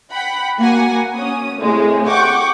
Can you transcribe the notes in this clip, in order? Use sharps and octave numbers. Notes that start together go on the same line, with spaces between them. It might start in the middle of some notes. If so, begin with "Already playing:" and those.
F#5 G5 B5
A#3 F#4 F#5 G#5
C#4 D#6
A2 C3 G#3
F#5 G5 C#6 D6